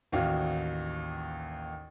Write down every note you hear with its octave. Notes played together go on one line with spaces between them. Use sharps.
A1 D#2 F#4 F5